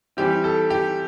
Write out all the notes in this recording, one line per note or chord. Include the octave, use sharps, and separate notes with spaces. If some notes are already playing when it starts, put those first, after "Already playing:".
E3 G3 C4 G4
A4
G4